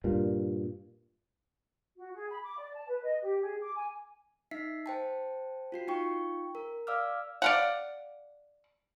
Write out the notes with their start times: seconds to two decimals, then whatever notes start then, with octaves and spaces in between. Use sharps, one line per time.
0.04 G2 A#2
1.97 F#4
2.15 G#4
2.29 B5
2.43 D6
2.58 D5
2.74 A5
2.88 B4
3.04 D#5
3.22 G4
3.42 G#4
3.61 D6
3.75 G#5
4.51 D#4 E5 B6 C7
4.86 C5 G5 A5
5.72 F4 F#4 C7
5.88 D#4 F4 G5 C#6
6.55 A#4
6.87 D5 F5 D6 E6 F6
7.42 D5 F5 F#5